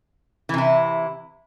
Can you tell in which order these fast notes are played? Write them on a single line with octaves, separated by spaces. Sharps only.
E3 C3 E4